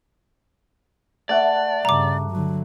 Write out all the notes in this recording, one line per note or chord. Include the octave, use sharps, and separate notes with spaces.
A3 D5 F#5 A5
G2 C#3 A#5 D6
D3 F#3